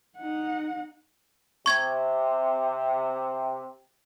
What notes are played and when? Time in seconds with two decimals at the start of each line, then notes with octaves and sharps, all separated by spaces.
0.17 D#4 F#5
1.66 C3 C#6 G#6